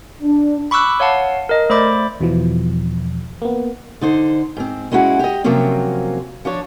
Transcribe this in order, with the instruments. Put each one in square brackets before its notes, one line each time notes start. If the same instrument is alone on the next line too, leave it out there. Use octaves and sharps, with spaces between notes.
[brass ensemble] D4
[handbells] B5 C#6 D6 E6 F#6
C#5 F5 F#5 A5
A#4 D#5
A3 C5 D5 B5 D6
[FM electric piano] E2 B2 E3 F3
A#3 B3
[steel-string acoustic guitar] D3 D#4 C5
G#2 C4
G#3 C#4 E4 F#4 G#4
G4 D#5
C3 F3 F#3 A#3 C4 C#4
F3 D4 C#5